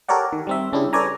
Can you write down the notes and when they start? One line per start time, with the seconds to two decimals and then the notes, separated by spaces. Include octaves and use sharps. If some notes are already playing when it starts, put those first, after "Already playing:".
0.09 G4 A4 A#4 C#5 D5 F#5
0.33 D#3
0.47 G3 C4 E5
0.73 C#3 C#4 D4 E4 G4 G#4
0.93 A4 B4 C#5 D5 G#5 A#5